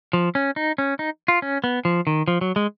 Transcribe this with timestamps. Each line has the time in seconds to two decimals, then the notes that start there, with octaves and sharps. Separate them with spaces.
0.13 F3
0.35 C#4
0.56 D#4
0.78 C#4
0.99 D#4
1.28 F4
1.42 C#4
1.64 B3
1.85 F3
2.07 D#3
2.28 F3
2.41 F#3
2.56 G#3